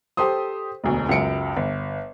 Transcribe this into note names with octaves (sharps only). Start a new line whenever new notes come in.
G4 A4 C5 C6 D#6
E1 D2 B2
C#2 F#2 C#7 D7
G1